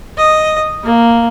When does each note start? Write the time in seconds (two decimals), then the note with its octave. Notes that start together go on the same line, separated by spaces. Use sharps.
0.18 D#5
0.83 A#3